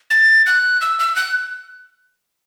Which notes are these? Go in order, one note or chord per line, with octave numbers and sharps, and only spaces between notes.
A6
F#6
E6
E6
F#6